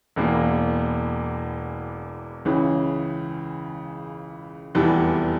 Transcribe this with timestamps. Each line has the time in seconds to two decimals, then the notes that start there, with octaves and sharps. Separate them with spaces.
0.16 E1 E2 E3 A#3
2.45 C#2 C#3 E3
4.75 F1 E2 E3 G3